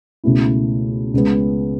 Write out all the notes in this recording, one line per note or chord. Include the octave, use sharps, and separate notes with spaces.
C#2 B2 A3 E4
C#2 C#3 G#3 B3